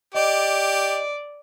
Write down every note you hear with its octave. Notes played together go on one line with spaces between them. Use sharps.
G4 D5 D#5